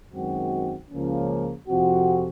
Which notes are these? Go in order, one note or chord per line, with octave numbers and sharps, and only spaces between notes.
F#2 D#3 G#3 C4 F#4
C#2 C#3 F3 A#3 C#4
F2 C3 F3 C4 F#4